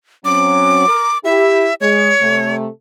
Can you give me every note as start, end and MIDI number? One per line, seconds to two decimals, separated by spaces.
0.25 0.87 54
0.25 0.87 60
0.25 0.87 61
0.25 1.18 86
0.88 1.11 70
1.25 1.70 64
1.25 1.70 67
1.25 1.74 76
1.81 2.11 56
1.81 2.56 73
2.21 2.67 48
2.21 2.67 57